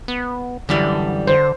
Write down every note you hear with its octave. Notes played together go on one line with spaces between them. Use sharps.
B3
F#2 D3 E3 G3
D3 C5